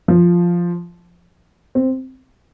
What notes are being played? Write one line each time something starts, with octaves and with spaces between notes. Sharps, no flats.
F3
C4